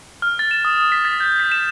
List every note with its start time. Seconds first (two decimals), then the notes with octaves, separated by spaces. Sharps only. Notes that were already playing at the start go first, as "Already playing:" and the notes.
0.22 F6
0.39 A6
0.51 E7
0.65 D#6
0.92 B6
1.05 A6
1.20 G6
1.40 B6
1.52 E7